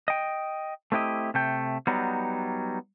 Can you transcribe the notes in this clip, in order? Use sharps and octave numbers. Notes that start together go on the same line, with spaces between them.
D#5 G5
A3 C4 E4 G4 D#5
C3 A3 G5
F#3 G3 B3 D#4